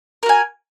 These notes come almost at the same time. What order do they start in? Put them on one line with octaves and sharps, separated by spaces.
A#4 F#4 G#5